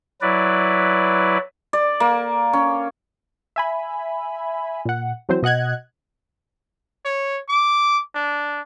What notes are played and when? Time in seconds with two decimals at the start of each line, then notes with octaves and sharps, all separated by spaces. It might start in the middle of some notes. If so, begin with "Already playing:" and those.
0.22 F#3 E4 B4 D5
1.73 D5
2.00 A#3
2.53 C#4
3.56 E5 G#5 B5
4.85 A#2 F#5
5.29 E3 F#3 C4 C5
5.43 B2 D#5 F#5 F#6 G#6
7.05 C#5
7.49 D6
8.14 D4